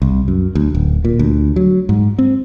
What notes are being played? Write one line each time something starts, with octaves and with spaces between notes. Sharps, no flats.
C2
F#2
D2
D1
A#2
D2
F#3
G#2
C4